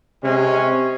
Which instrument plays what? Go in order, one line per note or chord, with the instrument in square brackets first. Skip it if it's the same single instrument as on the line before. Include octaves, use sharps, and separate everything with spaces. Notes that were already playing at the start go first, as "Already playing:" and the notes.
[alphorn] C3 [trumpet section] G#3 C#4